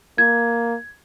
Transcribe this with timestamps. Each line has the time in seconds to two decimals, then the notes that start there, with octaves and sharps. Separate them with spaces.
0.18 A#3 G#6